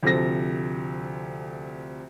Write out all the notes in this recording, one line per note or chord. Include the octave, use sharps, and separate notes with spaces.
D2 C3 F3 A4 A#6